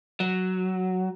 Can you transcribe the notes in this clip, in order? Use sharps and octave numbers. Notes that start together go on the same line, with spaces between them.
F#3